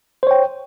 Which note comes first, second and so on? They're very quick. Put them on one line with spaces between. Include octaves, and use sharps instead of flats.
C5 C#5 G5